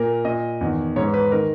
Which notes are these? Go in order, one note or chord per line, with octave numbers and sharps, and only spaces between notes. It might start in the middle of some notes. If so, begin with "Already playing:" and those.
Already playing: A#2 A#4
A#2 D#5
E2 D#3
G#2 E3 C#5
B4
D#3 A#4